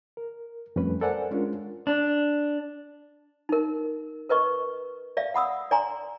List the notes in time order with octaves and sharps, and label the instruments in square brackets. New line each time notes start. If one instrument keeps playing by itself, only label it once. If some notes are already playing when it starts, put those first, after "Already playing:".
[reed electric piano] A#4
F2 G3 A3 C#4 B4
A4 A#4 C5 D5 F#5 G#5
G#3 C#4 D4 F4 A#4
[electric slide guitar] D4
[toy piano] D#4 A#4
A#4 B4 D#5 C#6
D5 E5 F5
F#5 B5 D#6 E6
D5 G#5 A#5 C6